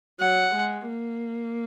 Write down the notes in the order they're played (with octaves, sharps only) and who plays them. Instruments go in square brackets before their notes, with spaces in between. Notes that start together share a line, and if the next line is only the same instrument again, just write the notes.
[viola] F#3 [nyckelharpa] F#5
[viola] G#3
A#3